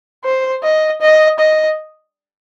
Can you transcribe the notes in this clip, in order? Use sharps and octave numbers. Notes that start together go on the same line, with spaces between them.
C5
D#5
D#5
D#5